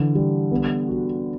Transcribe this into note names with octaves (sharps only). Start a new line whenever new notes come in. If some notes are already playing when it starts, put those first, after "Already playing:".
Already playing: D3 E3
G3
B3
F#4